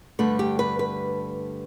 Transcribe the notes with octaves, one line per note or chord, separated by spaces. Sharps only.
G2 D3 A3 B4
G4
B4
B4